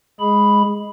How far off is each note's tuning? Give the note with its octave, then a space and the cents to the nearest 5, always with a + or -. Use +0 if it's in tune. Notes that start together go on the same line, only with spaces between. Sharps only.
G#3 +0 G#4 +0 B5 +0